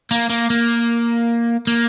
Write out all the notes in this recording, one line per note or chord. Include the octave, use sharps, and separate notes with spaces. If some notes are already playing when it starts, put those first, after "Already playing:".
A#3
A#3
A#3
A#3